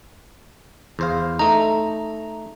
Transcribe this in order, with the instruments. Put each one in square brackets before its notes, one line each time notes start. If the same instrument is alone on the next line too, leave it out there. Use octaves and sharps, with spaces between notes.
[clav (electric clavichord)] E2 C5 F5
[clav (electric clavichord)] A3 D#4 [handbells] A#5